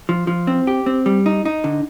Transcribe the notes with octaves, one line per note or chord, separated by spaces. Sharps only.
F3
F3
C4
G4
C4
G3
D#4
D#4
D3